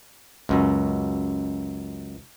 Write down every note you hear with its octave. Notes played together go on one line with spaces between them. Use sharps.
C#2 F#2